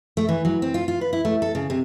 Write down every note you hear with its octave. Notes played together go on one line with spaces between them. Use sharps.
A3
E3
F#3
C4
F4
F4
B4
E4
A3
A4
C#3
C3